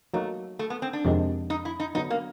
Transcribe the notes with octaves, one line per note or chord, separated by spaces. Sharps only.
F#3 A3 A#3 D#4 F#4
A3
B3
C4
D4
F2 C3 D#3 G#3
D#4
E4
D#4
D3 F#3 B3 D#4
A#3